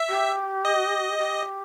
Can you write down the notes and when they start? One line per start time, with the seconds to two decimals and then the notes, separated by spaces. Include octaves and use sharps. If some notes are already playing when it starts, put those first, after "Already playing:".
Already playing: E5
0.09 G4
0.65 D#5
1.19 G4